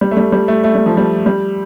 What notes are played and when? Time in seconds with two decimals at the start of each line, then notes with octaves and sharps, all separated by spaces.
0.01 G3
0.11 A3
0.17 G3
0.32 G3
0.48 A3
0.64 A3
0.75 G3
0.86 F3
0.97 G3
1.26 G3